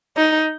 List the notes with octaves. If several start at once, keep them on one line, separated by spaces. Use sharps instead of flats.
D#4